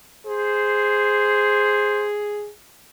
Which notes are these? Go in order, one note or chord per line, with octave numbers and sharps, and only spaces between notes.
G#4 C5